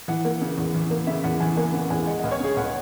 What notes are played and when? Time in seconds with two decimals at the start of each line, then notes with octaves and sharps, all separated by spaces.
0.08 E3 F#5
0.25 A#3
0.41 C#3
0.58 E2
0.74 E3
0.91 A#3
1.07 C#3 E5
1.24 E2 F#5
1.40 E3 G#5
1.57 A#3 G#5
1.74 C#3 F#5
1.90 E2 G#5
2.07 G#3 F#5
2.19 C#2 D#5
2.31 C#5
2.40 C#3 G#4
2.57 C#2 F#5